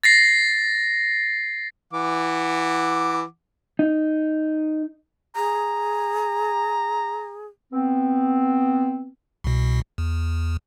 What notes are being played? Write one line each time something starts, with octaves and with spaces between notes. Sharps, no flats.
A6 A#6 C7
E3 F#5 D6
D#4
G#4 A#5
B3 C4
C2 B2
E2